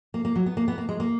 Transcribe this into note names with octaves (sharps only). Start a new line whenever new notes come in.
A#3
A#3
F#3
B3
A#3
B3
A#3
G#3
A#3